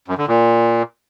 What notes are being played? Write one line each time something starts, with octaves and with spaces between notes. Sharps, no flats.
F#2
D3
A#2